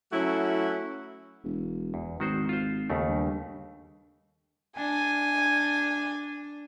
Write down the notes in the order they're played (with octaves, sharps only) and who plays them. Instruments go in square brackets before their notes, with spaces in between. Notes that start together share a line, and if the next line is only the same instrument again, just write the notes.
[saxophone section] F#3 A3 C#4 E4 F#4
[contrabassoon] E1
[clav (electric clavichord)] E2
[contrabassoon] G#1 [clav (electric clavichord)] D#3 F#4 C5
[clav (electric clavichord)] F4 C5
D#2 C#3 A3
[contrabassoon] G2
[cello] D4 [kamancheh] G#5